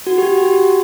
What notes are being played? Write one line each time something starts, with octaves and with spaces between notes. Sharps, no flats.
F#4
G4
F#4
G4
F#4